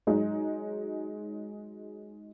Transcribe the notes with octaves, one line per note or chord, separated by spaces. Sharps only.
F#3 G#3 D#4